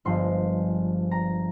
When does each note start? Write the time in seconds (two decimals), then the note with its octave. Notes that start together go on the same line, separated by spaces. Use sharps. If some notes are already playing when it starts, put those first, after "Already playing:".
0.05 G1 G2 F3 G#3 C6
1.11 A#5